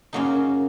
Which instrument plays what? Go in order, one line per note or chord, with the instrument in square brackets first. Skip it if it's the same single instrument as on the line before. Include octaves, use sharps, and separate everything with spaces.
[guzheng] F#2 C#3 F#3 A#3 D#4